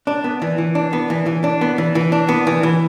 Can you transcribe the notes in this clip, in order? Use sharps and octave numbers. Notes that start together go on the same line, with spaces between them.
D4
B3
E3
E3
D4
B3
E3
E3
D4
B3
E3
E3
D4
B3
E3
E3